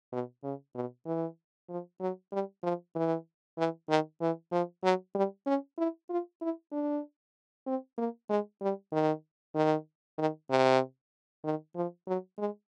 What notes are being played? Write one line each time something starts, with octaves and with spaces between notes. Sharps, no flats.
B2
C#3
B2
E3
F3
F#3
G3
F3
E3
E3
D#3
E3
F3
F#3
G3
C#4
E4
F4
E4
D4
C4
A#3
G#3
G3
D#3
D#3
D#3
C3
D#3
F3
F#3
G#3